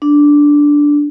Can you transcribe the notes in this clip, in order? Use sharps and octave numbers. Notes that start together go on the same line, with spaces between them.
D4